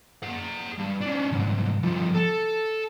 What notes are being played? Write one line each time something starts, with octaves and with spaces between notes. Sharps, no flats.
G#4 F#5
G2
C#4 D4
C2 G#2
G2 F3
A4